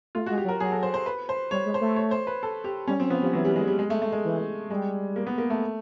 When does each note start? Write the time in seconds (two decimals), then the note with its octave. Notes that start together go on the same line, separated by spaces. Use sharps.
0.15 A3 F4
0.26 G#3 F#4
0.38 G4
0.45 F#3
0.48 A#4
0.60 F#3 G#4
0.72 A4
0.83 C5
0.94 C5
1.06 B4
1.29 C5
1.51 G3 C#5
1.66 G#3
1.74 C5
1.81 A3
1.96 C#5
2.11 C5
2.27 B4
2.43 A4
2.64 G4
2.87 G3 C#4
2.99 F#3 C4
3.10 F3 B3
3.22 F3 G3
3.33 E3 F#3
3.45 G3
3.56 G#3
3.67 G3
3.79 G#3
3.90 A3
4.02 A3
4.12 G#3
4.24 E3
4.70 G3 G#3
5.16 A#3
5.27 B3
5.38 A#3
5.50 A3